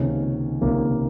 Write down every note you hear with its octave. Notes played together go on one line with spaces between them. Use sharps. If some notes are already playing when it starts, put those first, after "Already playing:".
Already playing: C#2 C3 D#3 A#3 C#4
C#2 C3 D#3 A#3 C#4